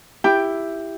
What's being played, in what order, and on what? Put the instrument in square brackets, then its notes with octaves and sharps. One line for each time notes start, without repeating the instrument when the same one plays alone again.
[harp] E4 G4 G5